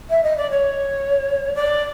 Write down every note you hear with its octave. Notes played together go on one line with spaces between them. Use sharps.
E5
D#5
D5
C#5
D5